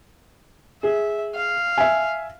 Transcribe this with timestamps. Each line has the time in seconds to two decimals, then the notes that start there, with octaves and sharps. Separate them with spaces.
0.83 G#4 E5
1.35 F5
1.78 E5 G#5